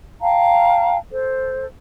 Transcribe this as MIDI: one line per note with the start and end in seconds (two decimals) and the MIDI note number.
0.21 0.97 77
0.21 0.97 79
0.21 0.97 81
0.21 0.97 82
1.11 1.65 69
1.11 1.65 72